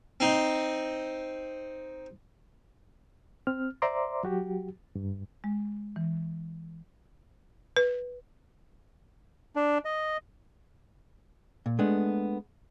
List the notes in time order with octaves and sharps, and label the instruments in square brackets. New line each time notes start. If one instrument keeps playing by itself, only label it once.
[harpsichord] C4 D#4
[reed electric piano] C4 F6
C5 D5 E5 A#5 C6 D6
F#3 F#4 G4
G2
[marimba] G#3
E3
[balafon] B4
[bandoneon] D4
D#5
[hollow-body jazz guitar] A#2
G#3 A3 B3 D4